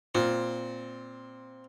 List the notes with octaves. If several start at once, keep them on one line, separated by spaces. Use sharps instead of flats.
A#2 C4